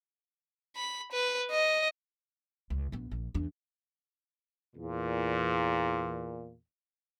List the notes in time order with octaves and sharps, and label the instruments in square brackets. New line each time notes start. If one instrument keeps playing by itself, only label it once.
[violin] B5
B4
D#5
[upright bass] C#2
A#1 B3
A#1
E2 D4
[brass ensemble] E2 A#2